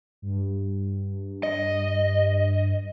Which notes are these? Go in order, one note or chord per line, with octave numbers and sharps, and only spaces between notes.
G2
D#5